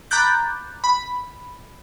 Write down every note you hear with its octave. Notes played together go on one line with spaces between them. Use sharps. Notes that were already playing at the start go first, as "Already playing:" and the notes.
A#5 B5 D6 F#6 G6 A6
B5